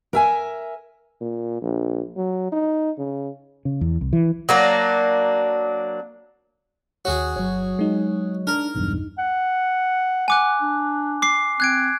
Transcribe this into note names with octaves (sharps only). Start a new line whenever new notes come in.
A#4 E5 G#5
A#2
A#1
F#3
D#4
C#3
C#3
E2
C2
E3
F#3 A#3 D4
D#2 F#4 G#4 C#5
G1 F#3 C#5
G#3 D#4
D4 A#4
B1 E2 G2
F#5
F#5 G#5 D6 F#6
D4
D6 C7
C4 F#6 G#6 D7